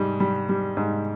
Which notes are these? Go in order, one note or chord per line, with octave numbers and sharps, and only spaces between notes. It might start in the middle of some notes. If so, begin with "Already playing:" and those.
Already playing: G#2 G3
G3
G3
G#2